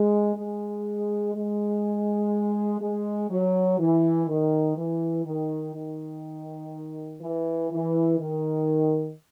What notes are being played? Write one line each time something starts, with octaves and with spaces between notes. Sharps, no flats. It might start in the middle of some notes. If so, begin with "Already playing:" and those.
Already playing: G#3
G#3
G#3
G#3
F#3
E3
D#3
E3
D#3
D#3
E3
E3
D#3